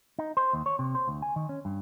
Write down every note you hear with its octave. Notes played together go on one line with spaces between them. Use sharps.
D#4
C5
D#2
C#5
C3
C5
D2
G#5
D#3
C#4
G2